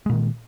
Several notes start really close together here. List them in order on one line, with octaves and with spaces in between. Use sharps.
G#3 A#2 D#3